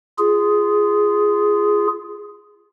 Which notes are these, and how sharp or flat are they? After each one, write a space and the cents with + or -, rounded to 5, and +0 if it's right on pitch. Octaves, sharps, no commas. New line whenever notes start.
F4 -15 G#4 +0